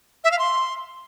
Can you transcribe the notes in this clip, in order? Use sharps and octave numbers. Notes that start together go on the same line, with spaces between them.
E5
F5
C6